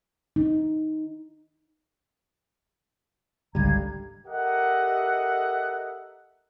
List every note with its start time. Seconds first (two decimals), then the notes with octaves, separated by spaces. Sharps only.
0.36 D#4
3.55 G#1 C#2 D3 G3 F5 A#5 G#6
4.28 G4 A4 A#4 D#5 E5 F#5